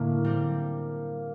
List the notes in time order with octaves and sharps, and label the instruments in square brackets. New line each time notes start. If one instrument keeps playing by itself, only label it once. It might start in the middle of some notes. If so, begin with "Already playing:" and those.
Already playing: [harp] A2 D3 D4 [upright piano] A#3
[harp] G3 C4